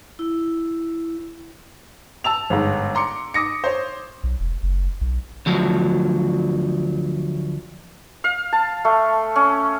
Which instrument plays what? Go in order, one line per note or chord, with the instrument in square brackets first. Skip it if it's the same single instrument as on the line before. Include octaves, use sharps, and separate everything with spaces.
[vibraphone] E4
[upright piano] A5 E6 F7
G1 G#2
A#5 C6 D6 C#7
D6 D#6 A#6 C#7
C5 C#5
[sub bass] B1
E1
F#1
B1
[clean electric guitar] D2 F3 F#3
[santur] F5
A5
A3
C#4